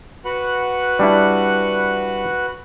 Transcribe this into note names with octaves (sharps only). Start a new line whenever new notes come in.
F#4 B4 F#5
G3 D4 E4